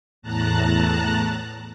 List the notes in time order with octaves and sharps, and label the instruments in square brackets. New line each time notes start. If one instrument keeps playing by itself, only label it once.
[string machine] E2 A2 A5 A#5 F#6